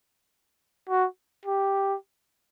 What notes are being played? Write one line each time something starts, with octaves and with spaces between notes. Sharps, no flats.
F#4
G4